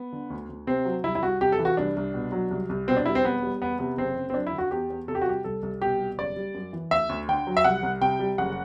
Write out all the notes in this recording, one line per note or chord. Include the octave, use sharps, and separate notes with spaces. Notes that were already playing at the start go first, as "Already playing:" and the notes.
Already playing: B3
D3
D2
D2
C3 C4
F#3
C2 E4
E4
C2 F#4
C3 G4
A4
E3
F#4
C2 D4
C2
B2
F#3
C2
C2
B2 C4
D4
G3 E4
C4
E1 B3
G3
E2 B3
C3 B3
F#1 C4
F#1
C4
F#2 D4
E4
D3
F#4
E2 G4
E2
C3 A4
G4
F#4
G3 G4
C2 A4
C2
B2 G4
G3
F#1 D5
G3
F#2
E3
D2 E5
D2
D3 G5
F#3
E5
C2 F#5
C2
C3 G5
G3
F#1 F#5